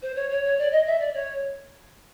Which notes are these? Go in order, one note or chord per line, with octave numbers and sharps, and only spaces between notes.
C5
C#5
C#5
C#5
D5
D#5
E5
D5
C#5